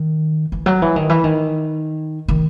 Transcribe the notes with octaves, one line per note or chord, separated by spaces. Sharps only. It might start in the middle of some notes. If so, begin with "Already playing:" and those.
Already playing: D#3
E3
F#3
E3
D#3
E3
D#3
D#3